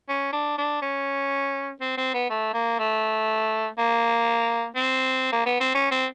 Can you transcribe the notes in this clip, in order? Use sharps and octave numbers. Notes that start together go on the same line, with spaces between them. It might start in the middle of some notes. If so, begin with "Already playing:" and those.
C#4
D4
D4
C#4
C4
C4
B3
A3
A#3
A3
A#3
C4
A#3
B3
C4
C#4
C4